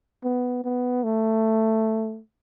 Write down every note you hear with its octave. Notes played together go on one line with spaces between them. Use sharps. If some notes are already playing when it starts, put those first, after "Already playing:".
B3
B3
A3